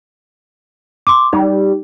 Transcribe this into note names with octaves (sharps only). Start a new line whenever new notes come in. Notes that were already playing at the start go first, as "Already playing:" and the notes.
C6 D6
G3 D#4